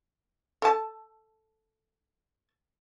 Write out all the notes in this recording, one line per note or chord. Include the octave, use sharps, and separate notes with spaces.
A4 A5